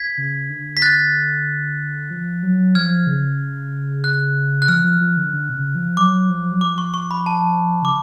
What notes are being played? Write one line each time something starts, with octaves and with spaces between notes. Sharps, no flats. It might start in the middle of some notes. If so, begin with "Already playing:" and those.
Already playing: G#6 B6
C#3
D3
B6
F#6 A6
F3
F#3
F3 F6 G#6
C#3
F#6
F#6
F3 F6
F3
F3
D3
D3
B2
C#3
F3
F#3 D6
F3
F#3
F3 D6
C#6
C#6
B5
A5
C#3 D6